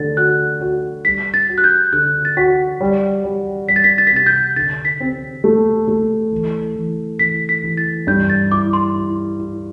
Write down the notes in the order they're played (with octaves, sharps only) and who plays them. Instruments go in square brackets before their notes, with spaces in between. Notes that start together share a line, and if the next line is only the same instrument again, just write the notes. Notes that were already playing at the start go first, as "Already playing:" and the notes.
Already playing: [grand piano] D3 A3 [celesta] A6
[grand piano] F#4 [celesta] F#6
[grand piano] F#4
[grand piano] G3 [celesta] B6
[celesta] A6
[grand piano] F#4
[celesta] F#6
G6
[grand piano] D3 [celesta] F#6
[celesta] A6
[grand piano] F#4 [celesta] B6
[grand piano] G3
G3
[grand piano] G3 [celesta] B6
[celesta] A6
B6
A6
B6
[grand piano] C3 [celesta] A6
[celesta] G6
[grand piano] D3 [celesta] A6
[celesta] B6
[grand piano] C4
A3
A3
E3
E3
[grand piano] E3 [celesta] B6
[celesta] B6
[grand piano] E3
[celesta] A6
[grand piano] G2 [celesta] G6
[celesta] A6
[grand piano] E4 [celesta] D6
[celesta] C6
[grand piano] E4
E4